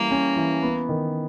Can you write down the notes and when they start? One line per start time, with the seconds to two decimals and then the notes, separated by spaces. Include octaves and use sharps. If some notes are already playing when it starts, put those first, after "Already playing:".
Already playing: E3 G3 A#3 C#4 E4
0.11 C#4
0.36 E3
0.62 B3
0.89 D#3